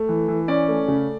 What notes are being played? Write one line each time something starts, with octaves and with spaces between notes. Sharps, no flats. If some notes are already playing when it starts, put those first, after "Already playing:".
Already playing: A3
E3
E3
C#4 D5
A3
C#3